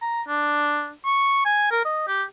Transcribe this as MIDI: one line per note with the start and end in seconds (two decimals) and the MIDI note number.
0.02 0.22 82
0.28 0.90 62
1.05 1.44 85
1.45 1.68 80
1.71 1.83 70
1.85 2.06 75
2.07 2.23 67